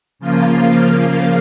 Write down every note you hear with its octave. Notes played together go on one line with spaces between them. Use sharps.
C#3 F3 A#3 F4